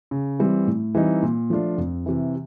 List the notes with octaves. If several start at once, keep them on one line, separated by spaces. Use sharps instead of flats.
C#3
E3 G3 C4
A2
E3 G3 C4 D#4
A#2
F3 A3 D4 F4
F2
C3 E3